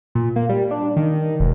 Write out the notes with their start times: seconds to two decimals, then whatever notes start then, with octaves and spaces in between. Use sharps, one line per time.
0.15 A#2
0.36 A#3
0.49 G3
0.71 D4
0.96 D#3
1.40 E1